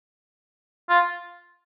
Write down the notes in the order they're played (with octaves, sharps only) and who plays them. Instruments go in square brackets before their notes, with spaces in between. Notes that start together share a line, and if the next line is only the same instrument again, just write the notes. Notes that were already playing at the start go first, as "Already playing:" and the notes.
[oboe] F4